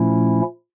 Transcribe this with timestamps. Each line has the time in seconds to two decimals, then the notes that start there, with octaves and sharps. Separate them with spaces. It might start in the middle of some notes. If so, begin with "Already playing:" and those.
Already playing: A#2 F3 A3 C#4 E4